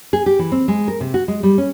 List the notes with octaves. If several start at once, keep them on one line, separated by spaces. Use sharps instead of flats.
G#4
G4
E3
C4
G#3
A#4
C3
F#4
G#3
G3
C#4